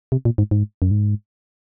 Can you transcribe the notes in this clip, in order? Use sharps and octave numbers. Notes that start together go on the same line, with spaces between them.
C3
A#2
G#2
G#2
F#2
G#2